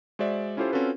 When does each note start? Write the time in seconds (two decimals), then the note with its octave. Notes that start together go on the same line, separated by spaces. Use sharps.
0.19 G#3 F#4 C5 D5 E5
0.57 C#4 E4 F4 G4 A4 C5
0.72 C4 C#4 F4 F#4 A4 B4